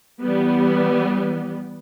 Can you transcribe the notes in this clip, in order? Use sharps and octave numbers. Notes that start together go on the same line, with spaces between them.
E3 G3 B3